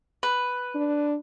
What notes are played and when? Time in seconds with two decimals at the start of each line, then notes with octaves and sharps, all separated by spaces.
0.23 B4
0.75 D4